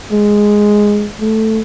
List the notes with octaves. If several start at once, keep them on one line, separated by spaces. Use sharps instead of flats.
G#3
A3